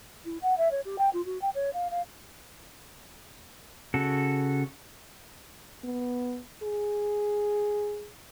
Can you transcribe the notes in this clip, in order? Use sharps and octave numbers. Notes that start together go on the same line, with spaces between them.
E4
F#5
E5
C#5
G4
G5
F4
F#4
G5
C#5
F5
F5
C#3 F#4 A4
B3
G#4